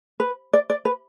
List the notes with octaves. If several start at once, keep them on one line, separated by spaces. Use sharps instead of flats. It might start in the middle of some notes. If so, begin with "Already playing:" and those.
B4
D5
D5
B4